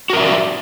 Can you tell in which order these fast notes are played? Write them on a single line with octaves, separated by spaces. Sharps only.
F#4 A#4 E5 D5